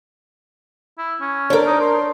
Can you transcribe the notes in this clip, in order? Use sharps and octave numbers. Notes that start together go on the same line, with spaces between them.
E4
C#4
D4 A#4 C5 C#5 D6
D#4
C6